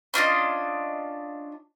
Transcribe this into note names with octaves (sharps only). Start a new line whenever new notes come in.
C#4 D4 F4 D#5